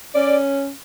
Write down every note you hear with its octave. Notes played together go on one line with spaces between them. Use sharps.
C#4 D5